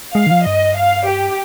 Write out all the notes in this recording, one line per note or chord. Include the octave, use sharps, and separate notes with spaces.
G#3 F5
D#3
F3
G2 D#5
F5
G4